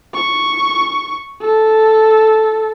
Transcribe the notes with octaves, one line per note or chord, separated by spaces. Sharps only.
C#6
A4